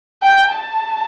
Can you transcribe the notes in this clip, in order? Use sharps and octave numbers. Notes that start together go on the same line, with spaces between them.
G5
A5